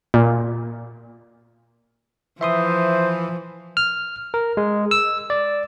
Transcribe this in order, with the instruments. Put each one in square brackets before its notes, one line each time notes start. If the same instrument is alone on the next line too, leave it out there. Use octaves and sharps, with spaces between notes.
[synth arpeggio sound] A#2
[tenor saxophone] E3 [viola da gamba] F3 [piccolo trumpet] C5 [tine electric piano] E5 C6 D#6
[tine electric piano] F6
A#4
G#3
E6
D5